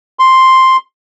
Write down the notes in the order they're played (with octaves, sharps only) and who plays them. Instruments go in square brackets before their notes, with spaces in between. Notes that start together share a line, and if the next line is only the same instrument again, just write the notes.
[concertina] C6